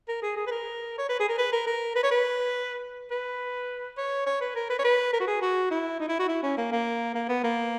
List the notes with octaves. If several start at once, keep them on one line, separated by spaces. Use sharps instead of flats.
A#4
G#4
G#4
B4
A#4
C#5
B4
G#4
A#4
B4
A#4
A#4
B4
C#5
B4
B4
C#5
C#5
B4
A#4
B4
C#5
B4
A#4
F#4
G#4
F#4
E4
D#4
E4
F#4
E4
C#4
A#3
A#3
A#3
B3
A#3